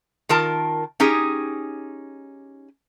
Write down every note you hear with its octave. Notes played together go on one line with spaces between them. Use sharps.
D#3 F4 A#4 A5
C#4 D#4 G4 G#4